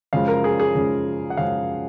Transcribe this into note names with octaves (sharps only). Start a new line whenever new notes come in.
F#2 C#3 F3 G#3 F5
A#4
G#4
G#4
F#2 C#3 F3 G#3
F#5
F#2 C#3 F3 G#3 F5